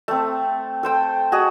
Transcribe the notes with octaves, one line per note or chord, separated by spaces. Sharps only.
A3 C4
A4 C5 G5
F#4 G#4 D#5